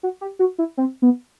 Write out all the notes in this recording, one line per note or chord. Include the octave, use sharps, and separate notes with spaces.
F#4
G4
F#4
E4
C4
B3